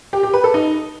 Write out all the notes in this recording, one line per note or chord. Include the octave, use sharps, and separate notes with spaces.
G4
G4
B4
A4
D#4